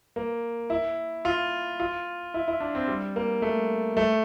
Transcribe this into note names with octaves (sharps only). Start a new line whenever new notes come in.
A#3
E4
F4
F4
E4
E4
D4
C4
G3
A#3
A3
A3